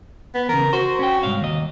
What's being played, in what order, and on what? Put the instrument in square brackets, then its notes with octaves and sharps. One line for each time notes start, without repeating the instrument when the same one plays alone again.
[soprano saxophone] B3
[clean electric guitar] E2 C#3 [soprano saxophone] A#4
[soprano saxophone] F#4 [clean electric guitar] C5
[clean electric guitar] C#4 G5
C2 G#2 F5
D#2 D#5